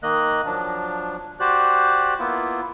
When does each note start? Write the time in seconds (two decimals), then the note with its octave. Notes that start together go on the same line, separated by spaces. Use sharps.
0.03 D#3 A#3 D#5 F#6
0.45 F3 F#3 D4
1.40 F#4 G4 C5 D5 F#6
2.19 A#3 B3 E4 F4